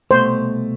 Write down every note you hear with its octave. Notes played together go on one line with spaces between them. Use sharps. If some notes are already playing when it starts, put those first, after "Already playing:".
C2 B2 A3 C5